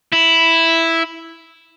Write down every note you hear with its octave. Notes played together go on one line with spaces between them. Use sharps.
E4